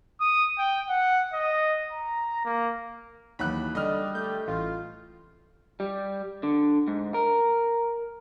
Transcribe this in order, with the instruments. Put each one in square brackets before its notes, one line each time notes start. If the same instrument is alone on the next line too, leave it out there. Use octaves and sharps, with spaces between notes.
[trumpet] D#6
G5
F#5
D#5
A#5
A#3
[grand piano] D#2 F#6 [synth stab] E3 F#3 B5
[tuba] D3 [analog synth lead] G3 [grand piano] D#5 F6
[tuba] A3 [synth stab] G6
[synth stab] A1 [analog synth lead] F4
[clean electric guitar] G3
D3
G#2
A#4